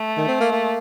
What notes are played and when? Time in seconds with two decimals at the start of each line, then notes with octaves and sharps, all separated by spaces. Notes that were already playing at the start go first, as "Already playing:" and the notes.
Already playing: A3
0.17 D#3
0.28 C4
0.40 A#3
0.52 A#3